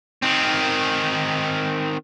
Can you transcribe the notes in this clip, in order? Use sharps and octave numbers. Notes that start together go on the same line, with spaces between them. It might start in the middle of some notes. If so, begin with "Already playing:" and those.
D#3 C4